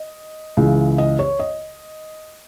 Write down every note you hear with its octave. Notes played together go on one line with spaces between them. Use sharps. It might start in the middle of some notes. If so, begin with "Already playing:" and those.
Already playing: D#5
C#2 C#3 E3
D#5
C#5
D#5